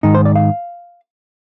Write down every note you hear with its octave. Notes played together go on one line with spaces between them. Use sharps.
G#2 D#3 D#4
C5
D5
F5